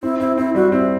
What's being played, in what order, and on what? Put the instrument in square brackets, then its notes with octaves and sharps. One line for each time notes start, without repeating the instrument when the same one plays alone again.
[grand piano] C4 [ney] E4
[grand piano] C4 [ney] E4
[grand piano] C4 [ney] E4
[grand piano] G3 [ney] F#4
[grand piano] C4 [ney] E4